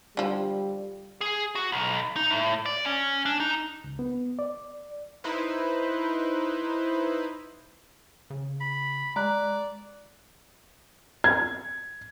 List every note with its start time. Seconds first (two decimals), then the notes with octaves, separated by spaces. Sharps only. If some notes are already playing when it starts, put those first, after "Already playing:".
0.17 D3 F3 G3
1.21 G#4
1.55 F#4
1.72 B1
2.16 D#4
2.30 A2
2.66 D5
2.86 C#4
3.25 D4
3.40 D#4
3.84 C#2
3.99 B3
4.39 D5
5.24 D#4 E4 B4 C5
8.30 C#3
8.60 B5
9.16 G#3 D5 A#5 F#6
11.24 G#6